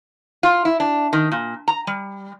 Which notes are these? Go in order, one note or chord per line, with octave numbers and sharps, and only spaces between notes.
F4
E4
D4
D#3
A#2
A#5
G3